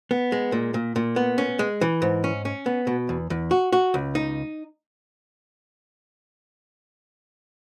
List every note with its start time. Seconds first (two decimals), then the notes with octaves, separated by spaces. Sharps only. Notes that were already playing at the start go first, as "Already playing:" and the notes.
0.11 B3
0.32 G#3
0.52 A#2
0.74 A#2
0.96 A#2
1.16 B3
1.38 C#4
1.59 G#3
1.81 E3
2.02 G#2
2.24 C#4
2.45 C#4
2.66 B3
2.87 B2
3.09 E2
3.30 E2
3.51 F#4
3.72 F#4
3.94 C#2
4.15 D#4